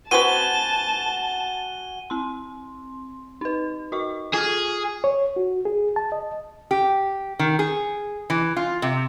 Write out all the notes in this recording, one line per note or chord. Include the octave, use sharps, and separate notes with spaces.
B3 C4 F#4 B4 G#5 A5 D#7 G7
C4 C6
D#4 B4
F#4 D#5 C#6
F4 G#4 F6
C#5
F#4
G#4
A5
D#5
G4
D#3
G#4
E3
F4
C3